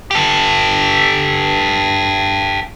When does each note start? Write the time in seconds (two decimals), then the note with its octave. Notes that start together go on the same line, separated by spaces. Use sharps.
0.11 G4 A4